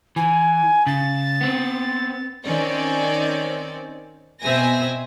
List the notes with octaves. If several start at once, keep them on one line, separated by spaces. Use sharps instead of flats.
E3 G#5
C#3 A6
B3 C4
D#3 C4 C#4 D5
B2 C4 E5 G#5 A#6